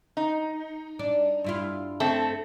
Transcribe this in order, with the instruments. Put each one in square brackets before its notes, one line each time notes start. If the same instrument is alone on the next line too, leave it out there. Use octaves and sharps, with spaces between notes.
[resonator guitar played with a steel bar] D#4
[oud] D4
G2 E4 F4
[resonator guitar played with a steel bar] A3 C4 A4